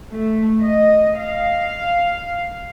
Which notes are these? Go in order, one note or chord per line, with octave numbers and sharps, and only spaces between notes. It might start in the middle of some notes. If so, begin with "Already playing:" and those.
A3
D#5
F5